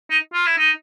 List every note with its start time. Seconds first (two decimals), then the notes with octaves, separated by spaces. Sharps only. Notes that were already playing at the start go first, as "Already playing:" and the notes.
0.10 D#4
0.34 F4
0.46 E4
0.58 D#4